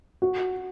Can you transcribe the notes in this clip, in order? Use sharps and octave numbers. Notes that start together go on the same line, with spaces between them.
F#4